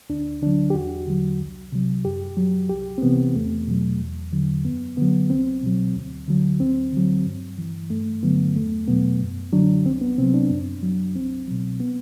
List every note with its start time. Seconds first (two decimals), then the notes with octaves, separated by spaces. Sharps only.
0.10 D2 D4
0.42 D3 F#3 D4
0.70 G4
0.75 E2 F#4
1.07 D3 F#3
1.40 C2
1.72 C3 F#3
2.05 F#2 G4
2.37 F#3
2.69 C2 G4
2.98 C4
3.02 C3 E3 B3
3.35 E2 A3
3.67 B2 F#3
4.00 E2
4.33 D3 F#3
4.65 F#2 B3
4.97 D3 F#3 B3
5.30 C2 C4
5.63 B2 F#3
5.95 D2
6.28 D3 F#3
6.60 D2 C4
6.93 D3 F#3
7.25 G2
7.58 E3
7.90 G2 A3
8.23 D3 F#3 B3
8.55 E2 A3
8.88 B2 F#3 B3
9.20 F#2
9.52 D3 F#3 D4
9.85 C2 C4
10.01 B3
10.18 C3 F#3 C4
10.34 D4
10.50 F#2
10.83 F#3
11.15 C2 C4
11.47 B2 F#3
11.80 B3